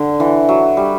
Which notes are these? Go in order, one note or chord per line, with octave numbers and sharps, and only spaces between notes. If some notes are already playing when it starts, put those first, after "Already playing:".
Already playing: D3
E3
F#3
G3